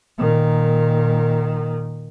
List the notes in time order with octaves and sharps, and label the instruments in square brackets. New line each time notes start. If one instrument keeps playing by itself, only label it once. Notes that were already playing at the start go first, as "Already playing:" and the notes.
[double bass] A#2 D#3